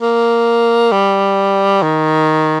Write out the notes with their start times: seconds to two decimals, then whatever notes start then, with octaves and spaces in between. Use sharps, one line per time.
0.01 A#3
0.92 G3
1.82 D#3